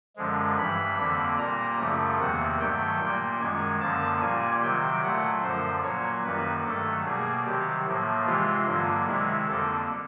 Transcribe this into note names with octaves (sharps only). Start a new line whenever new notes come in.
F#2 D3 F3 G#3
G2 E3 G3 B5
F2 D3 G3 A#3
A#2 G3 A#3 A#5
F#2 C#3 F3 A3
E2 C3 D#3 G3 A#3 F#5
G2 D#3 F#3 A3 G5
A#2 G3 A#3
F#2 D#3 G#3 G#5
F#2 D3 F3 A#3 A5
A#2 G3 A#3 G#5
C3 D#3 F#3 G5
A#2 F#3 A3 F#5
F#2 D3 F3 C5
A#2 F#3 A#3 C#5
F#2 D#3 G3 A#3 B4
G2 D#3 F#3 A3 A4
B2 G3 A#3 G#4
C3 D#3 F#3 G4
A2 F3 A#3
C3 E3 G#3 F4
G2 D3 F#3 A#3
C3 D#3 G#3 E4
F2 D3 G3 A#3 A4